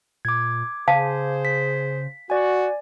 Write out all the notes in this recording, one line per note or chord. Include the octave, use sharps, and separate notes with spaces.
A#2 D6 G#6
C#3 G#4 C5 F5 A5
B6
F#4 D5 G#5